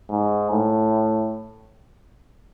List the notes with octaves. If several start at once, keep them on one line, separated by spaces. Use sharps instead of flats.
G#2
A2